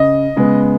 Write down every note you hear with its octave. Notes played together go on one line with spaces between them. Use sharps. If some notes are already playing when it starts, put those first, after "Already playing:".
Already playing: C#3 D#5
C#3 G#3 B3